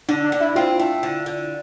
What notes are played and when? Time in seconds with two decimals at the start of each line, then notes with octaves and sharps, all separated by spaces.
0.09 D3 D4
0.25 D4
0.32 D3
0.40 E4
0.55 C4 F4
0.79 A3
1.03 D3
1.26 D3